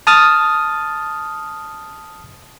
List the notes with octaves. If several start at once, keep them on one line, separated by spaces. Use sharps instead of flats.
A5 D#6 F6 A6